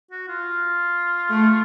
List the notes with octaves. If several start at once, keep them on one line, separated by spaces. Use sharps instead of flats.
F#4
F4
A3